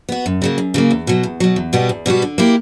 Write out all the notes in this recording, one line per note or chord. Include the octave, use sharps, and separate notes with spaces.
B3 F#4
F#2
C#3 F#3 A#3
F#2
C#3 F#3 A#3
E2
B2 F#3
E2
B2 F#3
E2
B2 G3 B3 F#4
E2
B2 G3 B3 F#4
D3
A#3 E4 G4